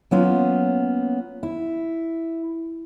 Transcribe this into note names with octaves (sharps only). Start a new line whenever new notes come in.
F#3 A#3 B3 C#4 F4
E4